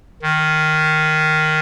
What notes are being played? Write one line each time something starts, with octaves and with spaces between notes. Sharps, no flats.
D#3